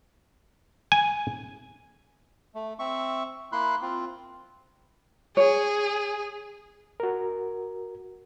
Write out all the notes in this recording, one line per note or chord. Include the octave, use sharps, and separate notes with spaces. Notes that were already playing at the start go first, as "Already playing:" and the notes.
G#5
A3
C4 E5 C#6
A#3 E4 B5 C6 F#6
C4 F4
G#4 C#5
F#4 A#4